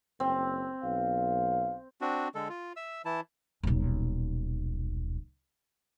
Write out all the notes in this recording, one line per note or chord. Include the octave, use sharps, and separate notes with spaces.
F#1 C4
B1 F5
C4 D4 F#4
D3 G#3 A4
F4
E5 E6
E3 E4 A5
D#1 B1